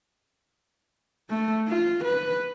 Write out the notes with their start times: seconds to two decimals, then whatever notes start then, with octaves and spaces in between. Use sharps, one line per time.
1.30 A3
1.68 F4
2.05 B4